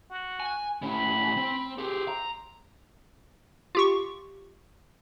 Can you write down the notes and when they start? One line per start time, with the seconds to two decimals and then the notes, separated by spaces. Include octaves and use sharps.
0.10 F#4
0.40 G#5
0.82 A2 C#4 B5
1.37 C4
1.78 C4 G4 G#4
2.08 A#5
3.75 F4 G4 C#6